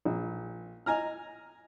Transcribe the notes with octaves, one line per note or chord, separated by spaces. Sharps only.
A#1
D#5 G#5 A#5 F6